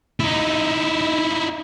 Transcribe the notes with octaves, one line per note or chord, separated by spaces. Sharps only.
D#4 E4